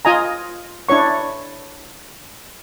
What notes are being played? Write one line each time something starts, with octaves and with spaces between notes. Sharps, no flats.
F4 D#5 G#5 A#5
D4 E4 C#5 C#6